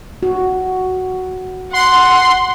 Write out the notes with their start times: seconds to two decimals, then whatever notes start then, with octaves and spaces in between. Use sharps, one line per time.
0.23 F#4
1.73 F#5 C6